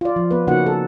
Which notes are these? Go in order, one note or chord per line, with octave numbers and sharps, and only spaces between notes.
F4 D5
F3
B3 B4
C#3 A#3 C#4 D#4 F#4 F#5
A4